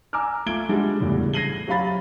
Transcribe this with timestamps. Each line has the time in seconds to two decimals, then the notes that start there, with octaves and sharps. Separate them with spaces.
0.13 G#5 A#5 D6 E6 F6
0.46 A3 F4 G#6 D7 G7
0.69 G3 G#3 D4 F#4
1.00 E2 A2 C#3 G3
1.34 G#6 A#6 C7 D#7 F#7 G7
1.68 F#3 C#4 G4 F5 B5 A6